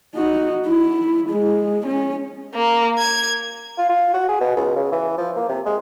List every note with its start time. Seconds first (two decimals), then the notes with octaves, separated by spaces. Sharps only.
0.15 D#4 F#4
0.67 E4
1.29 G#3
1.86 C#4
2.55 A#3
2.98 G#6
3.78 F4
3.89 F4
4.14 F#4
4.29 G#4
4.40 B2
4.57 C#2
4.76 C#3
4.92 E3
5.18 F3
5.36 A#3
5.49 C3
5.65 G#3